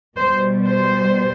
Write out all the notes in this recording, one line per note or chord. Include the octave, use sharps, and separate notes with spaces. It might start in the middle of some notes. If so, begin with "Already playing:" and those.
B2 G3 C5
C5